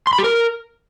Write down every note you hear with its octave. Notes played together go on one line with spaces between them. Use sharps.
C6
B5
G4
A#4